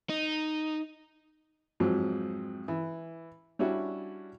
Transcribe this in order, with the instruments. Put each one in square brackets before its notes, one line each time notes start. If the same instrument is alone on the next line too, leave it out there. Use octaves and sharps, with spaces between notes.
[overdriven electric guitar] D#4
[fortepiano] F2 G#2 F3 F#3
E3
G3 C#4 D4 E4 F#4